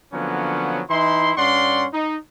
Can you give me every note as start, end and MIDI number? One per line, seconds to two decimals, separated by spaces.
0.13 0.82 50
0.13 0.82 53
0.13 0.82 54
0.13 0.82 58
0.13 0.82 59
0.13 0.82 61
0.91 1.32 52
0.91 1.32 63
0.91 1.32 64
0.91 1.32 84
1.38 1.86 43
1.38 1.86 61
1.38 1.86 74
1.38 1.86 78
1.38 1.86 84
1.94 2.17 63